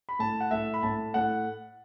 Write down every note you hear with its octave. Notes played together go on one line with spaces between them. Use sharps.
B5
A2 A5
F#5
A2 E5
B5
A2 A5
A2 F#5